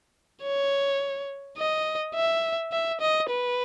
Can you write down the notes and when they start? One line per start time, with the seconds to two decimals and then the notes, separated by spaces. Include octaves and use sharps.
0.43 C#5
1.58 D#5
2.15 E5
2.72 E5
3.01 D#5
3.29 B4